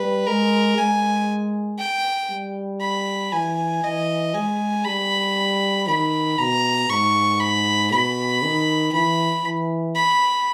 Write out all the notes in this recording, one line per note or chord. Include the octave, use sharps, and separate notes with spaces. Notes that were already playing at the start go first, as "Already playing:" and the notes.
Already playing: G3 B4
G#3 A#4
G#3 G#5
G5
G3
B5
E3 G#5
E3 D#5
G#3 G#5
G3 B5
D#3 B5
B2 A#5
G#2 C#6
B5
B2 B5
D#3
E3 B5
E3
B5